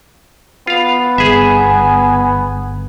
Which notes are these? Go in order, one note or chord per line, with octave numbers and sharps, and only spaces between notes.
B3 F4 F5
G1 G#4 E5 G#5